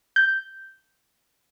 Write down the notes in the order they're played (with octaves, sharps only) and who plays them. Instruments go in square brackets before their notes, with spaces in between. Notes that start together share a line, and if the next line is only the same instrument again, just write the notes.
[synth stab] G6